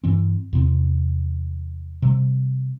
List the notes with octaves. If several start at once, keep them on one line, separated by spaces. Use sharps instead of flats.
G2 E3 C4
E2 C3 B3 C4
C3 G3